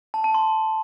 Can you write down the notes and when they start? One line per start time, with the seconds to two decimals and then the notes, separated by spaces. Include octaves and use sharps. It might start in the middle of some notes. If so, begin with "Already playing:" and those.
0.14 A5
0.24 A5
0.34 C6